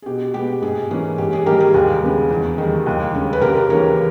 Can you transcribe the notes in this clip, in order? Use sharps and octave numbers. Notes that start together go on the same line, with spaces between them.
G#4
B2 G4
G#3 B3 G4
G#2 G#4
E3 A#3 C#4 G#4
G#2 G4
G#4
D#3 G3 A#3 G4 A#4
G#4
D#2 G#4
C#3 G#3 B3
E2
D#3
G3
D#2
C#3 G#3 C#4
B4
D#2 G4 A#4
C#3 E3 A#3 A#4 C#5